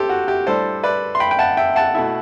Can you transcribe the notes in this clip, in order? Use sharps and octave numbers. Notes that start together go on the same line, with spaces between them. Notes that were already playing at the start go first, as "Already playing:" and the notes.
Already playing: G4 A4 C5
F#4
G4
A2 G3 D4 A4 C5
B4 D5
C6
G5 B5
G5
F#5 A5
E5 G5
F#5 A5
B2 A3 E4